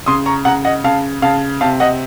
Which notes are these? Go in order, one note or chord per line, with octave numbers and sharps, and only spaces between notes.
C#3 C6 D#6
A#5 C#6
C#3 F#5 A#5
D#5 F#5
C#3 F5 A5
C#3 F5 A5
C3 F5 A5
D#5 F#5